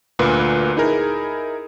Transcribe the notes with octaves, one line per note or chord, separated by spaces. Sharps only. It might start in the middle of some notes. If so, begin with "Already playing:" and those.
D2 A#2 A#3 B4
D#4 E4 G#4 A#4